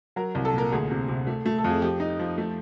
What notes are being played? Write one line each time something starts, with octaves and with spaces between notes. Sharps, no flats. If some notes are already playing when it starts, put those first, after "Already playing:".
F#3 A#4
C2
A4
A#2 A#4
D2 G#4
C3
C3
A3
A3
A4
F2
G#4
F3 G4
D#4
F3
A3